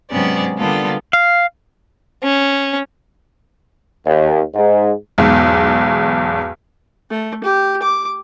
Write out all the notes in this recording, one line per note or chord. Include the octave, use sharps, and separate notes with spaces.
G#2 C3 F#3 B3 C#4 D5
D3 G3 A#3 B3 F4 A4
F5
C#4
D#2
G#2
B1 E2 G#2
A3
G4
D6